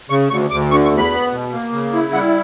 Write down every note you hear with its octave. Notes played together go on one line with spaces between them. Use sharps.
C#3 C#6
D2 C#6
D2 D6
D3 C#6
C#6
E2
B5
B3
B2
A#3
C#3
E4
G3 F#5